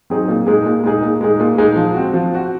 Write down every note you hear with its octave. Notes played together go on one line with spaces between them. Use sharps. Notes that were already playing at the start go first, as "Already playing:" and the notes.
F#3 C4 D#4 G#4
A#2
G#3 D#4 G#4
A#2
G#3 D#4 G#4
A#2
G#3 D#4 G#4
A#2
G#3 D#4 G#4
F3
C4 F#4
F3
C4 F#4